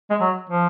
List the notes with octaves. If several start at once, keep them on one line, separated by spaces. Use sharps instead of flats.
G#3
F#3
F3